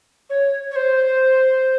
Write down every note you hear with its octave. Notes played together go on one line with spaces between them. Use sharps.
C#5
C#5
C5